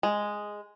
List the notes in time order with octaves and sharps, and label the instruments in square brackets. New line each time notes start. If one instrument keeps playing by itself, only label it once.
[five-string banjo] G#3